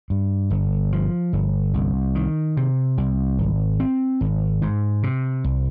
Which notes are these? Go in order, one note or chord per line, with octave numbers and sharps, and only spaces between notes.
G2
G1
F3
G1
C2
D#3
C3
C2
G#1
C4
G#1
G#2
C3
C2